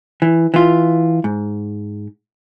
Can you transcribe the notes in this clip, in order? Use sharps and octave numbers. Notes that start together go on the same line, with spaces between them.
E3
E3 F4
G#2